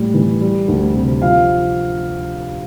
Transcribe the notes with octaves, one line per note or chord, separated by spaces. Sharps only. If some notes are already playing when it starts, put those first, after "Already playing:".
Already playing: A2 G3
E3
G3
D2
C3
F3 F5